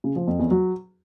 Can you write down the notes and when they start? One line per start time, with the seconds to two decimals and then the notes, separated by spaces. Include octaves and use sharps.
0.04 C#3
0.16 F3
0.27 F2
0.39 E2
0.51 F#3